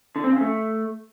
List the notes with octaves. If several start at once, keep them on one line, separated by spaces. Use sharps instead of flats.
D3
C4
C#3
A3